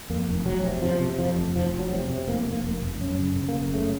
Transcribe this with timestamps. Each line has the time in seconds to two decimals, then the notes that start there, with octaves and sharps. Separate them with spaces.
0.10 F2 A#3
0.28 F1
0.46 F1 F#3
0.64 C3
0.82 C3 F3
1.00 C3
1.19 F2 F3
1.36 F1
1.55 F1 F3
1.74 F1
1.79 F#3
1.92 C3
2.10 C3
2.27 F1 A#3
2.46 F1
2.53 A#3
2.64 F1
2.82 F1
3.00 F#2 C#4
3.19 C#3
3.36 C#3
3.48 A#3
3.55 F#1
3.73 C#3 A3